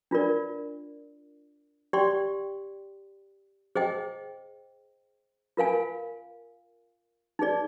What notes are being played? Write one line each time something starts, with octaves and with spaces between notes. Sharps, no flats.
D4 F4 A#4 D5
G4 D5 G5 C6
G#4 C5 D#5 G5
F4 A#4 F5 G#5
D#4 G#4 D5